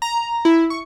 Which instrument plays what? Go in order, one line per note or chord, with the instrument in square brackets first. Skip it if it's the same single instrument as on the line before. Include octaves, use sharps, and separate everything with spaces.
[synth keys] A#5
E4
C#6